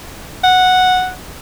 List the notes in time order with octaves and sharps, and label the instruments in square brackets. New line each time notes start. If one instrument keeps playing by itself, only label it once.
[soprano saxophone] F#5